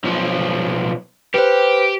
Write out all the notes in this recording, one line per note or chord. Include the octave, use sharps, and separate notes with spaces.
B1 F3
G4 B4 C5